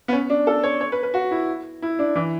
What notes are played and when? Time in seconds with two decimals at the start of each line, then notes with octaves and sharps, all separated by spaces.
0.08 B3
0.13 C#4
0.30 D4
0.47 A4
0.64 C#5
0.81 C#5
0.92 B4
1.03 B4
1.14 F#4
1.31 E4
1.82 E4
1.99 D4
2.15 E3